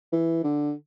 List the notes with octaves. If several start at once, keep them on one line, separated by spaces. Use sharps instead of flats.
E3
D3